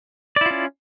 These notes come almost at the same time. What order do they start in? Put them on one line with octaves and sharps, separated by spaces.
D5 E4 F4 C#4